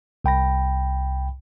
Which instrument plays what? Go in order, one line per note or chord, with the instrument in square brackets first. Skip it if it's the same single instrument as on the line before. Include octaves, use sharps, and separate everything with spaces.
[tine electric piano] C2 G5 B5 A#6